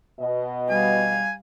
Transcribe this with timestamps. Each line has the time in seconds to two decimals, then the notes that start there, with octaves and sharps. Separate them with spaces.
0.20 B2 D#5
0.70 G3 F5 G#5